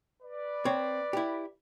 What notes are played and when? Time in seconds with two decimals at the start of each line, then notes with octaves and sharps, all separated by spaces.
0.23 B4 D5
0.65 C4 C#5
1.13 E4 G4